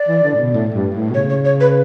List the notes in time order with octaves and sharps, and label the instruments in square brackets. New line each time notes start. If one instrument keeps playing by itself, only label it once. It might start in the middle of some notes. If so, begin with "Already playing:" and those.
Already playing: [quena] D5
[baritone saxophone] E3
D3
A2
B2
A2
G2
A2
B2
[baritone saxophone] C#3 [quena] C#5
[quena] C#5
C#5
B4